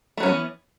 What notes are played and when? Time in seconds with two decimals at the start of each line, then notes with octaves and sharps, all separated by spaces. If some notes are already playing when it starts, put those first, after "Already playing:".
0.17 A3
0.20 F#3
0.23 C#4
0.26 B3
0.28 E3